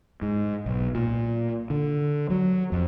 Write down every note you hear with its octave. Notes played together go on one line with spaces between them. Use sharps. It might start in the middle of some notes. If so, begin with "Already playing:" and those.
G#2
B1
A#2
D3
F#3
F2